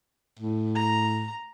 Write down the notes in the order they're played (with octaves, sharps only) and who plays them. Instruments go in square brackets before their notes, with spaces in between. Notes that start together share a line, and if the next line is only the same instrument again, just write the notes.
[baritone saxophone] A2
[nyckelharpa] A#5